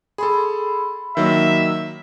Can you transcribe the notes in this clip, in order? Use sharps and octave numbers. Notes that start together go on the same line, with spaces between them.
G#4 A4 B5 C6
D#3 F#3 A#3 E5